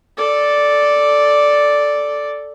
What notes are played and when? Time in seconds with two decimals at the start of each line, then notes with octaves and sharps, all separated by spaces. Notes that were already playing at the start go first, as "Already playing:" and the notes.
0.17 A4 D5